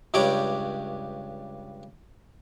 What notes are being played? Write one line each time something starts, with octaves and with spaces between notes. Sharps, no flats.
C#2 G2 G3 C#5 D6